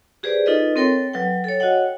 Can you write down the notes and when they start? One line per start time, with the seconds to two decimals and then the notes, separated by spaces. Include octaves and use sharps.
0.23 G4 G#4 B4 C5 D5
0.46 D#4 F4 A4 B4 D#5
0.76 C4 A4 A#4 C#5 G5 C6
1.14 F#3 B4 G5
1.44 A4 C#5
1.60 F#4 C#5 D#5 F#5 G5